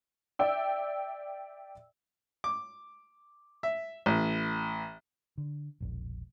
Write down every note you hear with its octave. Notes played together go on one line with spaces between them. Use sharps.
D5 E5 G5 E6
D6
E5
A1
D3
E1 A#1